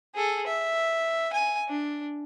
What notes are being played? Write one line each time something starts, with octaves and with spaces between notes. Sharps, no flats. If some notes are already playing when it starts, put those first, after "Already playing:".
G#4 A4
E5
G#5
D4